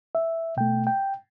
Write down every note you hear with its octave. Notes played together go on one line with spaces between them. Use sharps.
E5
B2 A3 G5
G5